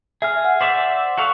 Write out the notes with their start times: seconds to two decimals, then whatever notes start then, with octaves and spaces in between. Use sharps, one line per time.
0.22 G#4 E5 F6
0.45 F#5
0.61 C5 D5 E5
1.18 F#4 A4 F5